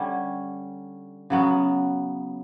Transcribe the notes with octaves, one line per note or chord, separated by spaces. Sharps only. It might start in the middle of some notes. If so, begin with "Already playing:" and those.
Already playing: D3 G3 C#4
C#3 F#3 B3